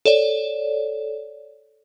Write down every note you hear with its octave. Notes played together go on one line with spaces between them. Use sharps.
A4 C#5 D5